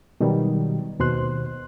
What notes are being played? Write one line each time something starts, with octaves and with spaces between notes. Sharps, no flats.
B2 D#3 F#3 G3
D#2 B2 C5 C6 F#6